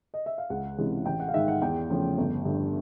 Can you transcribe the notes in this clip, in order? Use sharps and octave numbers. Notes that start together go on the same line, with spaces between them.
D#5
E5
F5
C#2 F#5
C3 E3 G#3 C#4
A1 G5
F#5
F5
G#2 D#3 E5
F#5
E2 G5
C#3 F3 A3 C#4
G1
G2 D3